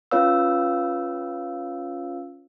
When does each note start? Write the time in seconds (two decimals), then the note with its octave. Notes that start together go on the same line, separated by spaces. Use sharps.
0.11 C#4 F4 B4 C#5 F5 E6